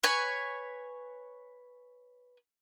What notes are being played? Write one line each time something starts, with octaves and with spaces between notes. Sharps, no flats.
B4 C#5 G#5